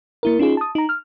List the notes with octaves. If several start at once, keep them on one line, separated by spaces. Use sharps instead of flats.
A#3 E4 A#4
C#4 D#4 F4 G#4
A5 D#6
D#4 A#5
F6